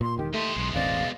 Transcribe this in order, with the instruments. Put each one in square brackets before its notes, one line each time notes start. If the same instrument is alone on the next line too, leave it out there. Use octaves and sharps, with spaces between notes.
[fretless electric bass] A#2 [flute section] C6
[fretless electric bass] E1 D#3 [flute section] G4
[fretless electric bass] A3 [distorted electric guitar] G4 D#5 [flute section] C6
[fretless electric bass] B1 [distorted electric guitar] G#3 B3
[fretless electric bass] E1 A1 C4 [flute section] D5 D#5 F5